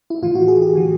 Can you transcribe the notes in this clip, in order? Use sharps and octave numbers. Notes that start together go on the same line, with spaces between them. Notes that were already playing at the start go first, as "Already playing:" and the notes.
E4
A2 E3 F4
F#4
G#4
G4
A2 E3